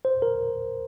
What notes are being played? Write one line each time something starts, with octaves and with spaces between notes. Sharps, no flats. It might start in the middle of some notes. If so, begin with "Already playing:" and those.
C5
A#4